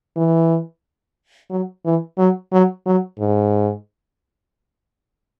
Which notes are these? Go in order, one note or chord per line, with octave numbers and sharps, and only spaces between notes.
E3
F#3
E3
F#3
F#3
F#3
G#2